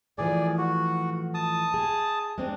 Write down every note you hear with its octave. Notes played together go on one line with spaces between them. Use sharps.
A2 E3 F3 G#4 D5
F#4
A5 D#6
G#4
G#3 C4 D4